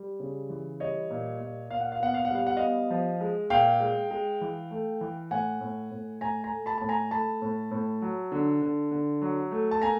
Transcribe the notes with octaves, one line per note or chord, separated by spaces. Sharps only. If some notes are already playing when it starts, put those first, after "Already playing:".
Already playing: G3
C#3
E3
G3 C#5 D#5
A#2
A#2
A#2 F5
F#5
F5
B3 F#5
F5
F#5
G3 F5
F#5
B3 D#5 F5
F3
G#3
A#2 F5 G5
G#3
G#3
E3
A3
E3
A2 F#5 G#5
A2
A2
A2 G#5 A#5
G#5 A#5
A3
A5 B5
A2 A5
G#5 A#5
A3 A5 B5
A2
A2
F#3
D3
D3
D3
F#3
A3
A5
A#3 G#5 A#5